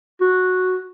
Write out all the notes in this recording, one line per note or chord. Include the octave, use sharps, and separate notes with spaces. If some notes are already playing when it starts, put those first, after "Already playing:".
F#4